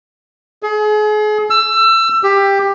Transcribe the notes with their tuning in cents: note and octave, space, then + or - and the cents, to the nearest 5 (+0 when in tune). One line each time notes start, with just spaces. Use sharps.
G#4 +35
E6 +25
G4 +15